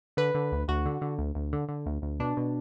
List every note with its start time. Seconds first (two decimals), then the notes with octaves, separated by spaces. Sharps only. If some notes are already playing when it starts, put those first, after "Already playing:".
0.17 D3 B4
0.34 D3
0.52 D2
0.68 D2 F#4
0.86 D3
1.01 D3
1.18 D2
1.35 D2
1.53 D3
1.69 D3
1.86 D2
2.02 D2
2.20 B2 D4
2.37 B2